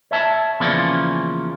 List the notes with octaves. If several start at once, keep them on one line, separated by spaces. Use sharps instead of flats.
C#5 E5 A5
E2 C#3 F3 A#3 C#4 D5